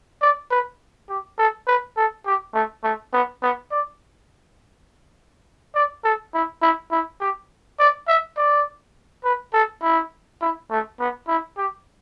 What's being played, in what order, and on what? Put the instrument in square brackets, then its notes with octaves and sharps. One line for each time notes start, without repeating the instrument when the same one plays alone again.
[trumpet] D5
B4
G4
A4
B4
A4
G4
A3
A3
B3
B3
D5
D5
A4
E4
E4
E4
G4
D5
E5
D5
B4
A4
E4
E4
A3
B3
E4
G4